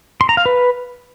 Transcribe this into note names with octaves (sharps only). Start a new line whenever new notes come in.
C6
A#5
F5
B4